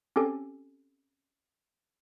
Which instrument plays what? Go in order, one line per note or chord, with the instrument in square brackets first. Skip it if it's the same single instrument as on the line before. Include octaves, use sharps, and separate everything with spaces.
[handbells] C4 C#4 G4 A4 G#5